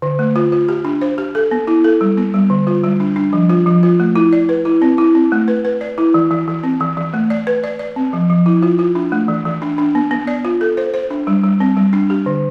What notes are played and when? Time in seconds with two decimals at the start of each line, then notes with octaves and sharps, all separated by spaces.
0.02 D3
0.19 A3
0.36 F4
0.52 F4
0.69 G4
0.85 D4
1.01 C5
1.18 G4
1.35 A4
1.51 B3
1.67 E4
1.84 A4
2.01 G3
2.17 B3
2.34 G3
2.50 D3
2.67 F4
2.84 G3
3.00 D4
3.16 D4
3.33 F3
3.49 F4
3.66 F3
3.83 F4
4.00 A3
4.16 E4
4.33 D5
4.49 B4
4.65 E4
4.82 C4
4.98 E4
5.15 C4
5.32 A3
5.48 B4
5.65 B4
5.81 D5
5.98 E4
6.14 E3
6.31 E3
6.48 E3
6.64 C4
6.80 E3
6.97 E3
7.14 A3
7.30 D5
7.47 B4
7.64 D5
7.79 D5
7.96 C4
8.13 F3
8.30 F3
8.46 E4
8.63 F4
8.79 F4
8.95 D4
9.12 A3
9.28 E3
9.45 E3
9.62 D4
9.78 D4
9.95 B3
10.11 B3
10.27 D5
10.45 F4
10.61 A4
10.77 C5
10.94 C5
11.10 D4
11.27 G3
11.44 G3
11.60 C4
11.77 G3
11.93 D4
12.10 G4
12.26 D3